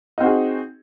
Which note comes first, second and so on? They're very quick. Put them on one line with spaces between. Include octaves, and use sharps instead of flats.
D#4 C4 F#4 G#4